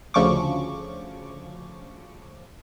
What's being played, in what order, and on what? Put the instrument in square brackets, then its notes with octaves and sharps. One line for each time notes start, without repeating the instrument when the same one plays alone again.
[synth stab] D2 C#3 F3 C#6 D6